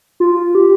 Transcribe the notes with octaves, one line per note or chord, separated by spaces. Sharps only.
F4
G4